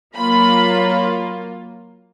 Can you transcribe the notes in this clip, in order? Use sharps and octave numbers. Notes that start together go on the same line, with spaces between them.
F#3 A#3 F4 B5